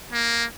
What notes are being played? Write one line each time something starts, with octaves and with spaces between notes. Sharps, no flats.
A#3